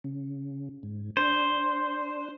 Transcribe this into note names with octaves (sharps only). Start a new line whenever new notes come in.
C#3
G#2
D4 C5